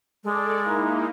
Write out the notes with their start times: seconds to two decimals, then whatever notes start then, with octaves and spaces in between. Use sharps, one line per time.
0.24 G#3 A4 D5
0.63 A#3 D#4 E4